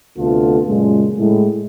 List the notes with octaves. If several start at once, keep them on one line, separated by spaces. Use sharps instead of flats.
D2 C3 A3 B3 F4 A4
F#2 A#2 C#3 G#3
A2 G#3